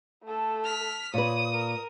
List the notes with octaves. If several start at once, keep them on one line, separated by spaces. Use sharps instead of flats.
A3 A4
F6 B6
A#2 B4 C#5 D#6
A#4